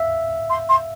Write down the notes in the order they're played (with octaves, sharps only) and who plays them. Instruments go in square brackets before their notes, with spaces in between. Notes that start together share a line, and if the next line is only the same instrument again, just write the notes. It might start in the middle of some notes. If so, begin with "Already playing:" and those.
Already playing: [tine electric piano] E5 F5
[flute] C6
C6